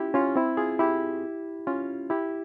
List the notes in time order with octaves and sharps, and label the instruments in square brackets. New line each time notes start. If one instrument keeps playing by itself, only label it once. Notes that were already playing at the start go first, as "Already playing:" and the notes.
Already playing: [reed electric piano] C#4 E4 F4 G4
C#4 F4
C4 E4
F4 G#4
E4 G4
C#4 F4
E4 G4